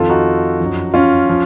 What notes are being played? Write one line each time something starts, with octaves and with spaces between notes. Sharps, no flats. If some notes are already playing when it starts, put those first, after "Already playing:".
Already playing: F2 D#3 F4 A4
D#4 F#4
F#2 F3
C#4 F4
F3